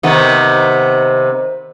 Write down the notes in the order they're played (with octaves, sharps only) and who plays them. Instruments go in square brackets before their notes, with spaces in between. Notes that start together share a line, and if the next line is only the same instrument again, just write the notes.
[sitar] C3 D#3 B3